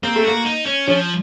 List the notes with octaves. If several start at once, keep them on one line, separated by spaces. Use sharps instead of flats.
A#3 C4
A3
A#3 F#4
D#4
C#4
F3 C#4